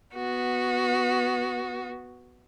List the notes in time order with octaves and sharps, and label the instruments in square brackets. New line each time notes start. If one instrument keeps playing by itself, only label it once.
[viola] B3 F#4